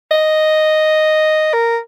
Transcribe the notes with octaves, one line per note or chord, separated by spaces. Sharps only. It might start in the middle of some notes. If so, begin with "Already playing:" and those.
D#5
A#4